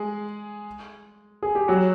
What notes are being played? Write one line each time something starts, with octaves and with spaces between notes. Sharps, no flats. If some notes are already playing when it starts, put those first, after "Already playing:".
Already playing: G#3 G#4
G#4
G4
F#3 F#4